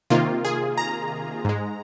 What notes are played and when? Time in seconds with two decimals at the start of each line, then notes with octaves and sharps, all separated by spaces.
0.10 C3 D#3 A#3 F4
0.45 G#4
0.78 A#5
1.45 G#2 G#3